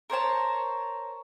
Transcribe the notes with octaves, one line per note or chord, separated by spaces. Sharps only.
A#4 C5 C#5 A5